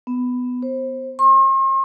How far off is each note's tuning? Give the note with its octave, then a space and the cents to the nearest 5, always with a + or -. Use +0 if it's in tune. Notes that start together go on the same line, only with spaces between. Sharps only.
B3 +10
C5 +20
C6 +45